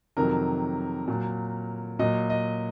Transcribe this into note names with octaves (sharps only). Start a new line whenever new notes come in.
F2 C3 D#3 F#3 A#4
A#2 F#3
A#2 F#3 D#5
D#5